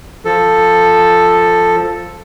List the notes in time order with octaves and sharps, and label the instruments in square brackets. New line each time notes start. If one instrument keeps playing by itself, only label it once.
[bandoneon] F3 A4